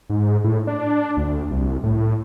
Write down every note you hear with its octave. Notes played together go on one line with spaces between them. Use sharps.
G#2
A2
D4
D2
C2
A2